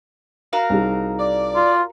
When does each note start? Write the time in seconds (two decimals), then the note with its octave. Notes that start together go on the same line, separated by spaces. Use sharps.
0.53 F#4 A#4 F5
0.70 C2 D#4 G#4
1.19 D5
1.56 F4